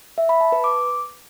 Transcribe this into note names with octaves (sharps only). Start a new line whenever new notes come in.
E5
B5
A5
B4
D6